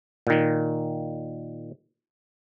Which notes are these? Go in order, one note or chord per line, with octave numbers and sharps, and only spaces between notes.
A#2 D#3